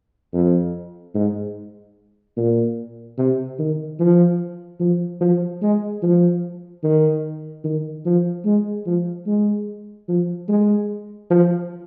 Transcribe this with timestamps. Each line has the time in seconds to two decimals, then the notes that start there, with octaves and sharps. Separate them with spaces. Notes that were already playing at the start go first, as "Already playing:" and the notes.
0.33 F2
1.15 G#2
2.37 A#2
3.18 C3
3.58 D#3
3.99 F3
4.80 F3
5.20 F3
5.62 G#3
6.02 F3
6.83 D#3
7.64 D#3
8.05 F3
8.45 G#3
8.86 F3
9.27 G#3
10.08 F3
10.49 G#3
11.30 F3